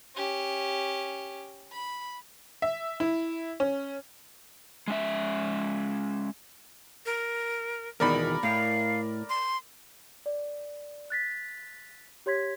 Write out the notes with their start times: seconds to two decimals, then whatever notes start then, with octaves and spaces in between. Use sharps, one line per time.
0.16 C#4 G4
1.72 B5
2.62 E5
3.00 E4
3.60 C#4
4.88 G#3 C#4 E5
7.06 A#4
8.00 E2 B2 D#3 A#4 D5 B5
8.43 A2 F5
9.29 C6
10.26 D5
11.10 F#6 A6 B6
12.26 G4 C#5 C6 G#6 B6